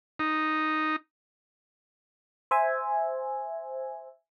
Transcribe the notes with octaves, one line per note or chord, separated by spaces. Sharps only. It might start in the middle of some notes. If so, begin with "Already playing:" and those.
D#4
C5 E5 G#5